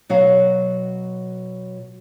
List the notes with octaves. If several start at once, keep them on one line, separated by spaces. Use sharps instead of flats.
B2 F#3 F#4 D#5 F5